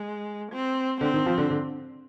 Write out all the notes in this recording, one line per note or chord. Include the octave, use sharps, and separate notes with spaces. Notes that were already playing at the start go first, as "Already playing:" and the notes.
Already playing: G#3
C4
D3 C4
D#3
F3
D3
D3